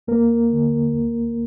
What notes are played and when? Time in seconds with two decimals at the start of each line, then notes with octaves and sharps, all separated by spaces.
0.08 D#2 A#3 A#4
0.50 D3
0.93 D2